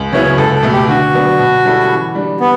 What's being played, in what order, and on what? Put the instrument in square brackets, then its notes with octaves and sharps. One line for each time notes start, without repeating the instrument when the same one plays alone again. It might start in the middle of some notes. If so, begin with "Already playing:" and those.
Already playing: [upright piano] C#2
[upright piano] C#3 F#3 B3 E4 [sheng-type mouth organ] C#5
[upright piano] C#2 [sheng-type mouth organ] A4
[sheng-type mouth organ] A4
[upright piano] B2 A3
[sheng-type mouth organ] G4
[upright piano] D3 [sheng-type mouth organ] F#4
[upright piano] F#3 B3 D4
B2
G3 C#4 E4 A4
E3
G3 D4
[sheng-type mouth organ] B3